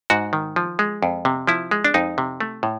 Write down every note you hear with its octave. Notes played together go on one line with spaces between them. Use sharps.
G#2 F#4
D#3
F3
G#3
F2
C3
F3 E4
G#3
D4
F2 D#4
C3
A3
A2